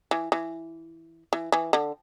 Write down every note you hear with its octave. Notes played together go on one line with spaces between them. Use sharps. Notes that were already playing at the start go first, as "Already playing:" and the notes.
E3
E3
E3
E3
D3